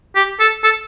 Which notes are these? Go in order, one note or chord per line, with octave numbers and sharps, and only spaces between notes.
G4
A4
A4